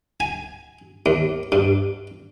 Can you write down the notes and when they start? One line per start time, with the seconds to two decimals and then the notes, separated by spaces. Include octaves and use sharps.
0.20 G#5
1.06 D#2
1.52 G2